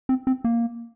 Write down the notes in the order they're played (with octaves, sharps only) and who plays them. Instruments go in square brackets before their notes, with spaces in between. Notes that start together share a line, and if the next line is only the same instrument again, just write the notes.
[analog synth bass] C4
C4
A#3